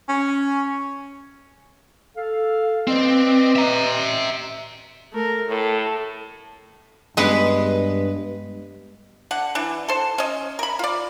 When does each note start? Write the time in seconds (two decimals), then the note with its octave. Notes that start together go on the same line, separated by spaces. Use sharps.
0.09 C#4
2.16 A4 F5
2.87 C4 B4 D5 D#5
3.56 E5 A#5
5.13 A3 A#4
5.49 A2 A4
7.17 G2 G#3 B3 B4
9.31 D3 F#5
9.55 E3 D4
9.88 A4 C5
10.18 C#4 D#5
10.59 A#4 B5
10.79 F4 D5